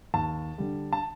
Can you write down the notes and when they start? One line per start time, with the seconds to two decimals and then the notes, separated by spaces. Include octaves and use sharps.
0.14 D#2 A5
0.58 D3 G3
0.93 A5